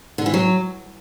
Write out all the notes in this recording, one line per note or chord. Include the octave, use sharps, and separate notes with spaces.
D3
E3
F#3